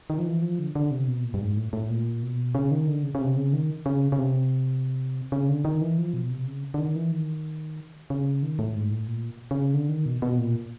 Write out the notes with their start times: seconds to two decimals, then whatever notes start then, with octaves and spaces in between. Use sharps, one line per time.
0.10 D#3
0.18 F3
0.26 E3
0.42 F3
0.59 D3
0.75 D3
0.91 C3
1.07 B2
1.24 A#2
1.34 G2
1.41 G#2
1.57 A2
1.73 A2
1.90 A#2
2.22 B2
2.55 C#3
2.71 D#3
2.87 D3
3.03 C#3
3.15 C#3
3.21 C3
3.36 C#3
3.53 D#3
3.86 C#3
4.12 C#3
4.18 C3
5.32 C#3
5.49 D3
5.65 D#3
5.81 E3
5.98 F3
6.13 B2
6.30 C3
6.47 C#3
6.74 D3
6.79 D#3
6.96 E3
7.12 D#3
8.10 C#3
8.43 D#3
8.59 A2
8.75 G#2
8.91 A2
9.08 A#2
9.51 C#3
9.74 D3
9.89 D#3
10.06 B2
10.22 B2
10.38 A#2